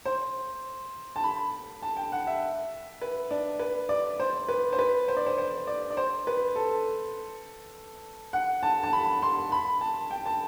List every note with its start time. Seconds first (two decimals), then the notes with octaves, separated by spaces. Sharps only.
0.05 C5
1.16 A5
1.24 B5
1.82 A5
1.97 G5
2.12 F#5
2.27 E5
3.01 B4
3.31 D4
3.59 B4
3.89 D5
4.20 C5
4.48 B4
4.73 C5
4.79 B4
5.08 C5
5.17 D5
5.26 C5
5.38 C5
5.67 D5
5.90 D5
5.97 C5
6.27 B4
6.56 A4
8.33 F#5
8.63 A5
8.83 A5
8.93 B5
9.22 C6
9.52 B5
9.81 A5
10.11 G5
10.26 A5